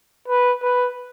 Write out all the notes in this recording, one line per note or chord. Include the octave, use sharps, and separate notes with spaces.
B4
B4